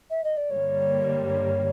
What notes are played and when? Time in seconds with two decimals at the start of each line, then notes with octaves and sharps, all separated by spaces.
0.10 E5
0.23 D#5
0.37 D5
0.50 G2 D3 G3 A#3 C#5